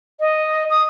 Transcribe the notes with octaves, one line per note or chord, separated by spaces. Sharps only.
D#5
D#6